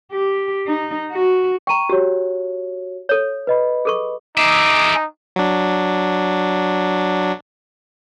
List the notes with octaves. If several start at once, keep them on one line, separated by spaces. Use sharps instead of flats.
G4
D#4
F#4
G5 A#5 C#6 D#7
F#4 G4 C#5
A4 C#5
B4 D#5 B5
G#4 A4 C#6
D#4 G#4 E5 D6
F#3 D4